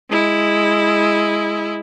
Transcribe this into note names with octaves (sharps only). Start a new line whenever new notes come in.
G#3 E4